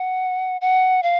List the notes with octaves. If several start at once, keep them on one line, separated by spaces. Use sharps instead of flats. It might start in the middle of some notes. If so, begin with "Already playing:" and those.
Already playing: F#5
F#5
F5